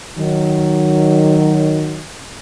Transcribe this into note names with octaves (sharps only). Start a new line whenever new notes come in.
D#3 F#3